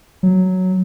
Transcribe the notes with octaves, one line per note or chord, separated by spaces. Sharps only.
F#3